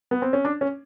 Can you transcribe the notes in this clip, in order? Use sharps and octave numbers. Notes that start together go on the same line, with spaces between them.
B3
C4
C#4
D4
C#4